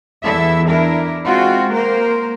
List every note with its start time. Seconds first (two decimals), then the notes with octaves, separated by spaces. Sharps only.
0.23 E2 E4 A4 E5
0.67 D4 E4 A#4
1.25 G#3 C4 F4 F#4
1.72 A#3 A#4 C5